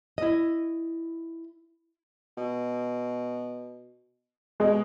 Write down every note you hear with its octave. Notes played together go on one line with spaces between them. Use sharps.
E4 D#5
B2
B2 G#3